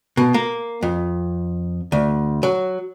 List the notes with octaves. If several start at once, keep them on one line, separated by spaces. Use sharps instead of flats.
B2
A#3
F2
D2
F#3